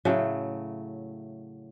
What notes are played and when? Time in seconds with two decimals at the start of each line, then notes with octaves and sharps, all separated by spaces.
0.05 A2 C#3 F#3 A3